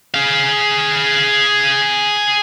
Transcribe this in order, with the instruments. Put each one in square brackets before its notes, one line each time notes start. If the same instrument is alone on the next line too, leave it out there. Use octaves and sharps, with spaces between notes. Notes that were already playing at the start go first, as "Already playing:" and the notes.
[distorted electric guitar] G#4 F5